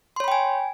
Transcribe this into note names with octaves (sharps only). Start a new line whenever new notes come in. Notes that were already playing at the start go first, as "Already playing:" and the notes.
C#5 G5 G#5 B5 C6